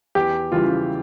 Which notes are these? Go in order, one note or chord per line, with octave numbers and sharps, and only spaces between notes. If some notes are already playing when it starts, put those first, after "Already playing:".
E2 G4
C#3 E3 G3 F4